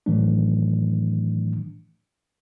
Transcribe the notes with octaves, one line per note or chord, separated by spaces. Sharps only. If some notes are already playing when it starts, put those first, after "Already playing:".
A2 D#3 E3 F#3 A3 D4